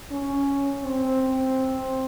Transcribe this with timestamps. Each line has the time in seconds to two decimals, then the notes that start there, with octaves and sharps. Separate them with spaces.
0.11 C#4
0.84 C4